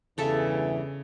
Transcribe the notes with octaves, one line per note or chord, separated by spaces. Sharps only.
E2 G2 C#3 E3 A4 E5